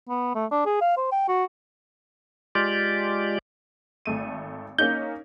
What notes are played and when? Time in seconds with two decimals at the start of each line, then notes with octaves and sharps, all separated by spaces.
0.09 B3
0.35 A3
0.51 D4
0.66 G#4
0.81 F5
0.97 C5
1.12 G5
1.28 F#4
2.55 G#3 F4 G4 D5
4.05 G#1 A3 D#7
4.78 A#3 C#4 D#4 G6